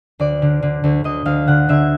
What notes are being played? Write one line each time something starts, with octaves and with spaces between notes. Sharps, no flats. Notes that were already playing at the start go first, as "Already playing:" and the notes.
D2 D5
D3
D3
D2
D2 D#5
D2 F5
D3 F#5
D3 E5